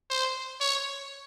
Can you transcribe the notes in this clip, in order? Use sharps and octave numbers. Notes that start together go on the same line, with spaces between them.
C5
C#5